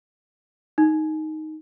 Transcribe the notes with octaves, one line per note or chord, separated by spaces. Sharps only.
D#4